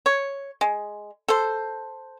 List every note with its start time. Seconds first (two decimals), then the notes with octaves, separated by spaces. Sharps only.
0.06 C#5
0.61 G#3
1.28 A4 C5